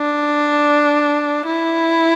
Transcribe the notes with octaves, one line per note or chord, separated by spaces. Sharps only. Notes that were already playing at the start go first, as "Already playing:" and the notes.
Already playing: D4
E4